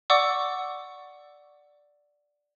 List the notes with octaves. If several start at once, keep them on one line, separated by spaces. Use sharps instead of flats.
D5 F#5 C#6 D6 E6